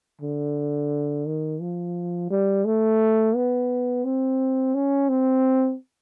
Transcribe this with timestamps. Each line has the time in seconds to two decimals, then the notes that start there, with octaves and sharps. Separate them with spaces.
0.21 D3
1.27 D#3
1.61 F3
2.30 G3
2.65 A3
3.35 B3
4.04 C4
4.75 C#4
5.09 C4